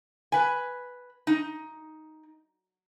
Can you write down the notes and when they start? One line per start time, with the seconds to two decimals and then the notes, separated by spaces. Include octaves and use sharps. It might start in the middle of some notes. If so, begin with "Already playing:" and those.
0.32 B4 G#5
1.27 D#4